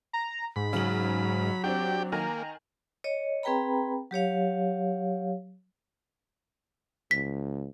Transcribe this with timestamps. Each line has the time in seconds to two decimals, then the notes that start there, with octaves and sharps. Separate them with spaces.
0.13 A#5
0.56 G#2 B5
0.73 C#3 F#3 F#7
1.64 C4 D4 F#4 G4 G5
2.12 D#3 A#3 G#5 A#5
3.04 C#5 D#5
3.43 C4 G#4 B4 G5 A#5 B5
4.11 F#3 G4 C#5 F5
7.11 C#2 B6